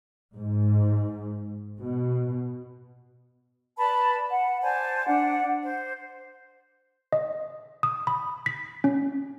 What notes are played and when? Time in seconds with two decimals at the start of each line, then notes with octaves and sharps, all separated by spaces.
0.36 G#2
1.80 B2
3.78 B4 D5 A5 B5
4.30 F#5
4.62 C5 D5 G#5 A5
5.06 D4 F#5
5.64 C5
7.13 D#5
7.83 D#6
8.07 B5
8.46 B6
8.84 C#4